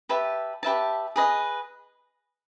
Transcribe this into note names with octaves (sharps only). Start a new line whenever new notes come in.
G4 B4 E5 A5
G4 B4 E5 A5
G#4 B4 D#5